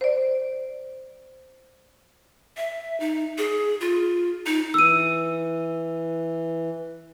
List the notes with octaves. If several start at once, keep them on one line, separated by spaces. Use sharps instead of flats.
C5 D5
E5
D#4
G#4
F4
D#4
E3 E6 D#7